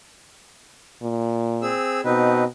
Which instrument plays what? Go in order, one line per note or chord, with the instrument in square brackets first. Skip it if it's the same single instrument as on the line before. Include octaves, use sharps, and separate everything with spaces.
[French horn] A#2
[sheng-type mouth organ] C4 G#4 E6
[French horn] B2 [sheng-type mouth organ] C4 D#4 B4